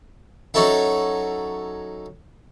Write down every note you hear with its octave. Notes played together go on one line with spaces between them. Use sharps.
F#3 C#4 D#4 A4 E5